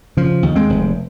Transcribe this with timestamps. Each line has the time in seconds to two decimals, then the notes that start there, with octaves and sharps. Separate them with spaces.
0.17 C#3 F3
0.43 D#2
0.56 G#3 C4
0.70 F1